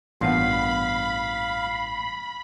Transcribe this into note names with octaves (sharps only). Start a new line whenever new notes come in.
A1 G2 A#2 E3 B3 F5 F#5 B5